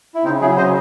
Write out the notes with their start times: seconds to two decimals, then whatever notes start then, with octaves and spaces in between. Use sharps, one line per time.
0.15 E4
0.24 C#3 C4 D#4
0.41 F#3 E4 G#4
0.57 C#3 C5 D#5